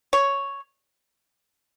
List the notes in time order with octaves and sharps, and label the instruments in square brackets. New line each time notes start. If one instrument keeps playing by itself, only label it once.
[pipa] C#5